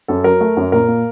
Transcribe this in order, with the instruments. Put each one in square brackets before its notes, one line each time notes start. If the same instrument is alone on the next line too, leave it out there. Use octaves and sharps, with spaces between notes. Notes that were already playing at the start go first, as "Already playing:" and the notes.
[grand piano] F#2 A4
F#3 A#4
A3
F#2
A#2 A#4
A#3